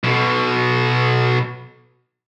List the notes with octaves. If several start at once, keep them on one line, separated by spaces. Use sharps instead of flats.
B1 B2